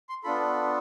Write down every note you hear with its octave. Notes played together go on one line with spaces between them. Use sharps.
C6
B3 D4 F4 A4 B5